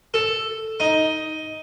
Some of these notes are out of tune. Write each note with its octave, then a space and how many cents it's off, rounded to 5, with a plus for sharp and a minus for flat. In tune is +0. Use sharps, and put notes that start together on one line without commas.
A4 +5
D#4 +10